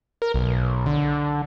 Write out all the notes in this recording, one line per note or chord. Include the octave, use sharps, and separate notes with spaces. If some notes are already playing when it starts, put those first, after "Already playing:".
A#4
B1
D3